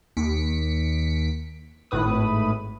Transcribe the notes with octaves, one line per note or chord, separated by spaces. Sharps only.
D#2 B6 C#7 D7
G#1 A2 B4 D#6